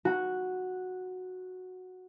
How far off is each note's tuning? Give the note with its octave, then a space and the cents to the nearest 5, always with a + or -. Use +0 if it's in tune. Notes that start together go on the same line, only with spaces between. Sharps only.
F#4 -5